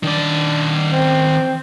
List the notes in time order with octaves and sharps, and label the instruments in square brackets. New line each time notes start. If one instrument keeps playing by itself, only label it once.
[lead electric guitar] D#3 D5 [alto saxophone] D4
[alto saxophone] C4